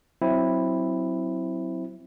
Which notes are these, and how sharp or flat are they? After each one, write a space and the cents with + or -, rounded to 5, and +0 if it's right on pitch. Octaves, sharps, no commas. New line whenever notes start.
F#3 +0 C4 +5 E4 +0